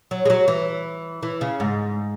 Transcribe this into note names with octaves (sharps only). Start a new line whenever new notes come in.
F#3
G#3
F#3
E3
E3
C#3
G#2